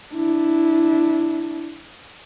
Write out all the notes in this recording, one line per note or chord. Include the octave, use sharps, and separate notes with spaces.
D4 E4